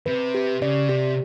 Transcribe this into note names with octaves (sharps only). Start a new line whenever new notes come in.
C3 B4
G4
C#3 D5
C3 G4